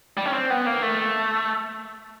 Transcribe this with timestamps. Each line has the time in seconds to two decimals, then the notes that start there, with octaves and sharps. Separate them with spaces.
0.17 G3
0.26 C#4
0.34 C4
0.50 B3
0.66 A#3
0.82 A3